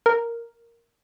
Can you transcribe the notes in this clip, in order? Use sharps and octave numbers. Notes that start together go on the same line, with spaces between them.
A#4